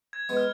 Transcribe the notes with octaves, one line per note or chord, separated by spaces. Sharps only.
G#6
G#3 B3
F6